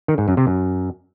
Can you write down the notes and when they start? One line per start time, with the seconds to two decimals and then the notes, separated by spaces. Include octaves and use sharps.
0.08 D#3
0.18 G#2
0.28 F#2
0.37 C3
0.47 F#2